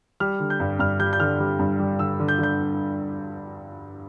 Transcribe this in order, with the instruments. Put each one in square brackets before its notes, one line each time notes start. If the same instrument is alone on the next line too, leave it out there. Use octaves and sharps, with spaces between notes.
[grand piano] G3 F6
D3
G6
G2
G2 F6
G3 G6
G6
D3 F6
G3
G2
G3
D3 E6
D3
G6
D3 G6